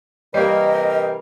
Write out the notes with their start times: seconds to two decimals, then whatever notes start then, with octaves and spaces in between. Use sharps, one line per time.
0.34 C3 E3 G3 A#3 A#4 D#5